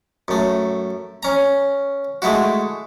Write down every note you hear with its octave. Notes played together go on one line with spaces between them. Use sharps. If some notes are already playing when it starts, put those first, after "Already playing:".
F#2 A3
C#4 A#5
G#3 A3 E4 F#4